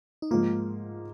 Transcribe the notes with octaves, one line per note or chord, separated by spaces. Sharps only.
D#4
G#2 F3 A#3 F4